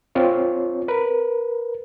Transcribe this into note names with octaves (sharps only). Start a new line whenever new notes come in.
C4 F4 C#5
A#4 B4